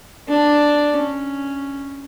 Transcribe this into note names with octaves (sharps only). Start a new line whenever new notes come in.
D4
C#4